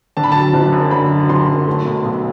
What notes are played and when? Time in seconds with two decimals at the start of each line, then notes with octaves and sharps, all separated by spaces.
0.17 D3 A5
0.24 B5
0.32 F#3 A5
0.54 F#1
0.72 F#2
0.91 D3 B5
1.11 F#3
1.29 F#1 C6
1.48 F#2
1.67 A3
1.85 B1
2.05 B1